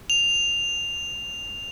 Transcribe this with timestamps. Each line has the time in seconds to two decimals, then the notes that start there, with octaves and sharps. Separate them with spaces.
0.10 F7